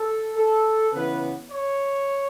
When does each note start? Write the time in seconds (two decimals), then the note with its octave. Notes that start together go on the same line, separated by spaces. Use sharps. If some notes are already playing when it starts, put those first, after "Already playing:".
Already playing: A4
0.36 A4
0.93 C#3 E3 B3 B4
1.49 C#5